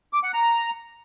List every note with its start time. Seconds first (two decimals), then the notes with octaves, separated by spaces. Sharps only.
0.13 D6
0.23 F#5
0.34 A#5